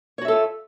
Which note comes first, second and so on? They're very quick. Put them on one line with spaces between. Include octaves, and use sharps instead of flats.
C#5 F#4 E5 A4 F4